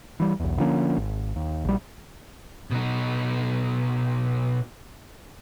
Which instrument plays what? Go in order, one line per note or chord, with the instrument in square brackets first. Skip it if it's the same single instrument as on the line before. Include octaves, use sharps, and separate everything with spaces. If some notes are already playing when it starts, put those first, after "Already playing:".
[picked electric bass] E3 G3
B1 E2
D3 F3 A#3 C#4
G#1
D#2
A#1 G3
[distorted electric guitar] B2 D#4